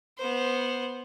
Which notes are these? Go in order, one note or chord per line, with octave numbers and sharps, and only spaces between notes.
B3 C5